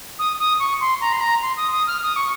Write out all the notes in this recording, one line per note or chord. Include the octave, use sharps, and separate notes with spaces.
D#6
D#6
C#6
C6
A#5
C6
A#5
C6
D#6
D#6
F6
D#6
C#6